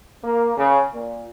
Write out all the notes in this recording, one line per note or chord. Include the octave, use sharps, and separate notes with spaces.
A#3
C#3
A#2